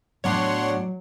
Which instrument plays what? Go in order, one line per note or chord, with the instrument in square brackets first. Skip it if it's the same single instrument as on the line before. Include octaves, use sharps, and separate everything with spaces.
[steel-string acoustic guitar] A2 B3 D4 [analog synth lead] F#3 [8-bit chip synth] C#5 F#5 C6